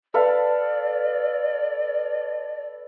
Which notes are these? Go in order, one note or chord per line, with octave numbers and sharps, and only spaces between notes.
A4 B4 D5 F5